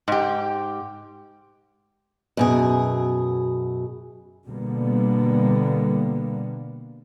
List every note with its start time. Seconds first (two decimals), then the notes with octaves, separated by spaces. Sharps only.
0.08 G#2 G4
2.37 F#2 B2 G#4
4.49 B2 D3 G3 A#3 B3